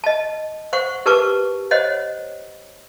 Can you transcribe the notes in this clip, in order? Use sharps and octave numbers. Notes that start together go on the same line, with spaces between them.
D#5 A5
C5 F#5 C#6
G4 A#4 B4 A5 C#6 D6
C5 C#5 D#5 F#5